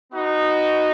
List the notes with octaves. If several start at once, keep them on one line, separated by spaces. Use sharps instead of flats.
B3 D#4 F#4